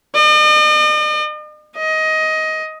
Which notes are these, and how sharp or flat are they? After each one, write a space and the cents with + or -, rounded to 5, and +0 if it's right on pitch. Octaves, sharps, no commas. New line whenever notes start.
D#5 -45
D#5 +15